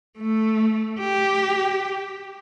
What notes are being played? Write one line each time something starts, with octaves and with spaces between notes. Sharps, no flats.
A3
G4